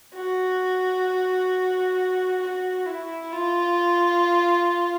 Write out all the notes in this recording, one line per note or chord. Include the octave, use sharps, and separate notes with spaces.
F#4
F#4
E4
F4